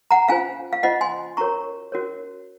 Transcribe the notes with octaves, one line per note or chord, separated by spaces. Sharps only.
F#5 A#5
C#4 F4 C5 F5 G#5
F5
C#4 F4 C5 D#5 F#5
G#5 C6
C#4 F#4 A#4 C#5 A#5 C#6
C#4 F#4 A#4 C#5